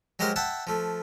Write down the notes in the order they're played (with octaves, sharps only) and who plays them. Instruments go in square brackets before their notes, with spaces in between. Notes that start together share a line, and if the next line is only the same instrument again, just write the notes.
[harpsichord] F#3 G#3 G4 A#4 C5 C6
E5 F#5 G5 A5
F3 A3